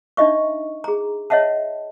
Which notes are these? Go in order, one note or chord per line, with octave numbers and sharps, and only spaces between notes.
D4 D#4 D#5 E5 C#6
G#4 A#5
C#5 D#5 E5 F#5 A5